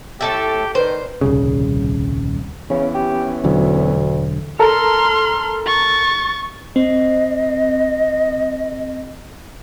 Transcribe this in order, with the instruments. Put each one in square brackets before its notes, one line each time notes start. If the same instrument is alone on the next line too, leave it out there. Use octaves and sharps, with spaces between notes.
[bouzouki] A2 A4 E5 [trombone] G4
[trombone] D#3 [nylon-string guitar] B4 D5 [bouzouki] C5
[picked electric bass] D#1 C2 C#3
[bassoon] C#3 [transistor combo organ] E3 B3 C#4
[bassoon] G4
[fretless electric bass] E1 D3 F#3 [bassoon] D2
[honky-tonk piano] A4 A#4 A#5 [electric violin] C6 F6
[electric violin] C#6 A6
[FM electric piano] C4 [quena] D#5